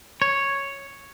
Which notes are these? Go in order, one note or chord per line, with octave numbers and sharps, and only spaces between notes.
C#5